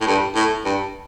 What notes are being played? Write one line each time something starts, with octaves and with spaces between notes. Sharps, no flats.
A2
G2
A2
G2